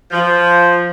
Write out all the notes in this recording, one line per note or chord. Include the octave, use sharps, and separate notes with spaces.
F3